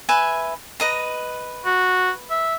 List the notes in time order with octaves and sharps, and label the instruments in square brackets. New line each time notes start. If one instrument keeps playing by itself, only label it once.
[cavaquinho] B4 E5 G#5
B4 D#5 A#5
[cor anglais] F#4
E5